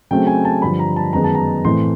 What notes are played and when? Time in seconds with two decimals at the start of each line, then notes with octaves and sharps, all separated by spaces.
0.11 C#3 F#3 A3 C4 G5
0.27 G#5
0.45 A5
0.62 G2 D3 F3 B5
0.79 A#5
0.96 A5
1.13 F#2 D#3 G#3 B3 A#5
1.24 A5
1.35 A#5
1.65 A2 E3 A3 C4 C6